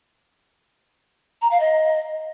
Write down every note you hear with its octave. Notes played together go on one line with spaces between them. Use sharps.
A#5
F5
D#5